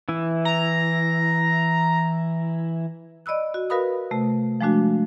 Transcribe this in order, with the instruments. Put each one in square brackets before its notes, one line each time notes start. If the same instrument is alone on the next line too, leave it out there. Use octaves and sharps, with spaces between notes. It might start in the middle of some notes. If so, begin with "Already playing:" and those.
[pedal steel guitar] E3 E4
[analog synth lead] A#5
[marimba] D5 D#5 B5 E6 F#6
F#4
F#4 A#4 B4 F5 B5 D#6
C3 A3
F3 G#3 A3 D4 F#4